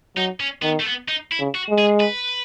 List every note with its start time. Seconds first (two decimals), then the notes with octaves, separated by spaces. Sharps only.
0.16 F#3 D#4
0.40 C#4
0.62 D#3 B3
0.79 A3
0.86 B3
1.08 D#4
1.32 E4
1.40 C#3
1.55 F#4
1.70 G#3
1.78 G#4
2.00 B4